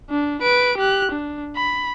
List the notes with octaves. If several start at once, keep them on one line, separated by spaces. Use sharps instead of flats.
D4
B4 D7
G4 F#6
D4
B5